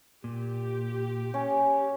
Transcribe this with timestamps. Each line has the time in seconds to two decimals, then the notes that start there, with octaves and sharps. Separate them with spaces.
0.24 A#2 G4
1.34 C#4